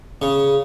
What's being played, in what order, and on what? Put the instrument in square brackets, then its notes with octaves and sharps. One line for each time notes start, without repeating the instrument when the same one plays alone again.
[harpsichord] C#3